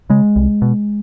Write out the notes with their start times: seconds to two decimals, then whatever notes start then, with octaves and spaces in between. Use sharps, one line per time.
0.10 C#3 G#3
0.36 C2
0.62 B2